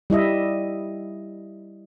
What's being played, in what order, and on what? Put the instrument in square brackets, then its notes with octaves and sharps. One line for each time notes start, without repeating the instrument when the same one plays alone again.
[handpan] G3 E4 D#5 E5